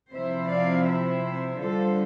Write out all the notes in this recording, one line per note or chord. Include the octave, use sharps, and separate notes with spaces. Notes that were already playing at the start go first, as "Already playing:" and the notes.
C3 F3 C4 E4 C5 E5
D5 F5
C5 E5
D3 G3 D4 F4 A4 C5